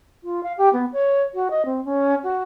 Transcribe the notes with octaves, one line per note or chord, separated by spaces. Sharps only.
F4
F5
G4
B3
C#5
F#4
D#5
C4
C#4
F#4